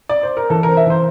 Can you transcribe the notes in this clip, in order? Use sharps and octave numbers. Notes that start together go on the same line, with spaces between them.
D5
C5
A#4
E3 A4
C4 A#4
E5
E3 C5